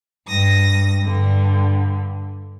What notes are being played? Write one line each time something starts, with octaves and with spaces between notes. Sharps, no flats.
G2 D#6 A#6
G2 D3